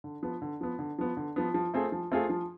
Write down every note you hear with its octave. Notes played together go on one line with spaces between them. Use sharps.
D3
F3 B3
D3
F3 B3
D3
F3 B3
D3
F3 B3
F3
A3 C4 F4 G#4
F3
A3 C4 F4 G#4
F3